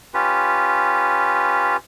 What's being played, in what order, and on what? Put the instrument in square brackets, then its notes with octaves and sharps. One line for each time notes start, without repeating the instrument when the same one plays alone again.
[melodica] C#4 F4 G4 B4